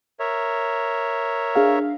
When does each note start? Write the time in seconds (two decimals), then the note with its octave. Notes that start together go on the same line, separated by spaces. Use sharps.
0.20 A#4 C#5 E5
1.55 D4 G#4 F5